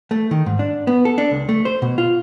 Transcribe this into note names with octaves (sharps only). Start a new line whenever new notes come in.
A3
D#3
G#2
D4
B3
A4
D4
C#2
A3
C5
B2
F4